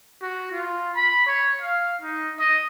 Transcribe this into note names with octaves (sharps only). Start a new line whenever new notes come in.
F#4
F4
B5
C#5
F5
D#4
D#5